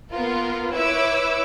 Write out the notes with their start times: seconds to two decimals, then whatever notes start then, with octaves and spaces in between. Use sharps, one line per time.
0.12 A#3 B3 F4 A#4
0.73 E4 B4 C#5 D6 E6